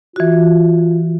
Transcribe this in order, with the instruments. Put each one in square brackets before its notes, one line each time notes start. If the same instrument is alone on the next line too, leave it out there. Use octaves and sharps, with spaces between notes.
[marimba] E3 F#4 [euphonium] F4